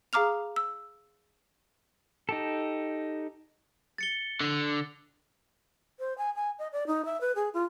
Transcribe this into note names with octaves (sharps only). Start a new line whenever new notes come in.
G#4 F5 A#5 D6 F6 F7
E6
D#4 G4 A4
A6 C#7 G7
D3
C5
G#5
G#5
D#5
D5
D#4
E5
B4
G#4
F4